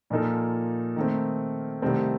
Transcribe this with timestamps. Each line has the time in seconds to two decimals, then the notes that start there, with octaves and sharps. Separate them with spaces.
0.10 A#2 F3 A#3 D#4 A4
0.96 D#3 A3 C4
1.82 C2 C3 D#3 A3 C4